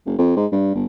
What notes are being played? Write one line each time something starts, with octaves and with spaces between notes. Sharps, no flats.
F#1
F2
G#2
G2
G1